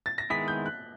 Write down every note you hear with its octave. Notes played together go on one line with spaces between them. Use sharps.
A6
A#6
D#3 G#3 B3 E4 G#4 B6
G6
F#6